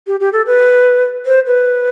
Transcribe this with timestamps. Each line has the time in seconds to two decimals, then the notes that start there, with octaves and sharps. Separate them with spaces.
0.07 G4
0.20 G4
0.33 A4
0.46 B4
1.26 C5
1.46 B4